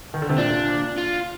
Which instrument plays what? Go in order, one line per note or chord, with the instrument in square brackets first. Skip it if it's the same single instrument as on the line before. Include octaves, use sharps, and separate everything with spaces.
[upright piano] D#3
D3
C3
[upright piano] A#2 [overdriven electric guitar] D4
[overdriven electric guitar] F4